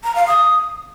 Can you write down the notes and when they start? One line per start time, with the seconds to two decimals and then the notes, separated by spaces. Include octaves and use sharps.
0.04 A#5
0.15 F5
0.27 D#6